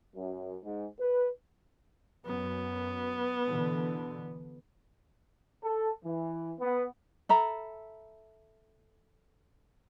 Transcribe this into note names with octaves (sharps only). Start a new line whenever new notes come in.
F#2
G#2
B4
F#2 B3
B2 D3 E3
A4
E3
B3
A4 E5 A#5 B5